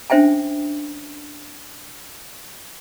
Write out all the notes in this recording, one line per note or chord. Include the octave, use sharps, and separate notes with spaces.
C#4 D4 C5 E5 G5 G#5